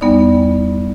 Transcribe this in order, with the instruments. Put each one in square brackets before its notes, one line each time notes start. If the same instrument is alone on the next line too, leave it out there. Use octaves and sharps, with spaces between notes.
[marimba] E2 G3 B3 D#4 D5